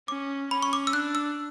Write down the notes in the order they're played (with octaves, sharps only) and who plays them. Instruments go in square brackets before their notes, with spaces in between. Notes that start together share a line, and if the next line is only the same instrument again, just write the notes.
[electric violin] C#4 [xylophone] D6
[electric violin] C#4 [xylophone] B5
[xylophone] C#6
D6
E6
[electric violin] D4 [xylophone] F#6
[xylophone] E6